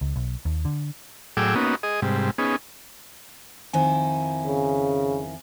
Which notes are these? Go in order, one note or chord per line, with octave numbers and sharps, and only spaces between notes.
C#2
B1
D#2
D3
A2 F#3 G#4 G5 D6 E6
A#3 B3 C#4 D#4 F#4
G#4 D#5
G#2 C3 G3
B3 C#4 D#4 G#4
F2 D#3 E4 C5 G#5
C#3